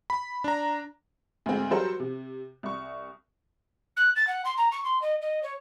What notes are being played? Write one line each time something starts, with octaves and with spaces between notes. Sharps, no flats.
B5
D4 A#5
D2 G#2 C4
F#3 G3 F#4 A4 A#4 C5
C3
C2 C#6
F#6
A6
F#5
C6
A#5
C#6
C6
D#5
D#5
C#5